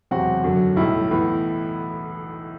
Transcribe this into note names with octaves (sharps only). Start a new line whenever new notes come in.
E1 E2 C3 F#3 C4 F#4
F#2 D3 F#3
B1 A2 G3 E4
A2 E3 B3